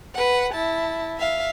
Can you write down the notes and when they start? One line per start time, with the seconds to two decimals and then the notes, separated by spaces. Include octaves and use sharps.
0.14 B4 F#5
0.54 E4 A5
1.18 E5 F5